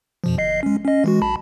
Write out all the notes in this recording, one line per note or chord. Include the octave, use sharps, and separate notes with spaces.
F2 B2 F3
G1 D#5 C7
G#3 C#4
C#4 D#5
E3 G#3 F#4
B1 A5 B5